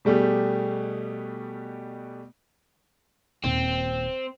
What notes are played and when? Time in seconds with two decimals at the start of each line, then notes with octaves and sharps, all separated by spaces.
0.05 B2 G3 A3 G4 G#4
3.44 D#1 C4